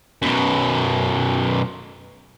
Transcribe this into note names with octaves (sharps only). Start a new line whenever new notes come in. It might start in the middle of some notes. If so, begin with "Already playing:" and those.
F#2 B2